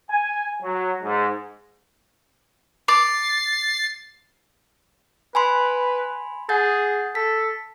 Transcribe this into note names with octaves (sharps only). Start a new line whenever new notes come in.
G#5
F#3
G#2
D6 A6 C7
B4 G#5 B5 C6
G#4 F#5 G6 A6
A4 B6